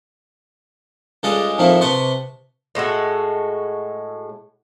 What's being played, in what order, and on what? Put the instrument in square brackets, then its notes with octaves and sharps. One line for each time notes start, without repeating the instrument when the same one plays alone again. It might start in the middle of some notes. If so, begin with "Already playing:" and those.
[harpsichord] C#2 G3 G#3 A4 D5 D#5
F2 A2 F3 A#3 D#4 E4
C3 B4 C5 A5 C6 C#6
[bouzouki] A2 G#3 F#4 A4